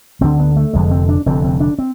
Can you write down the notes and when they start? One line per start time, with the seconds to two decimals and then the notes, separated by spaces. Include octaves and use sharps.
0.21 D2 D3 C4
0.39 B3
0.56 A3
0.73 F1 F2 D3 G#3
0.91 C4
1.09 D4
1.26 F1 F2 D3 C4
1.44 C4
1.60 D4
1.79 C4